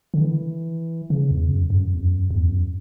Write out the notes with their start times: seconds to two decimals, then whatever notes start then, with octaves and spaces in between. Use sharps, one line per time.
0.14 D3
0.21 E3
1.10 C#3
1.31 E2
1.51 F#2
1.70 F#2
1.94 E2
2.01 F#2
2.30 E2
2.49 F#2